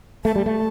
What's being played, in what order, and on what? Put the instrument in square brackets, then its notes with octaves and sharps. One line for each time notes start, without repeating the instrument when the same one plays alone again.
[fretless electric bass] A3 [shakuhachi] A5
[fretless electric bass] G3
A3